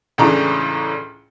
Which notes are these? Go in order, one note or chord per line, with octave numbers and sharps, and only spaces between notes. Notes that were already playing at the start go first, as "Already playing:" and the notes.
C#2 A2 C#3 E3 D4 A#5